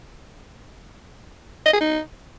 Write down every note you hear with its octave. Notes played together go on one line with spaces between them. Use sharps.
D#5
G#4
D#4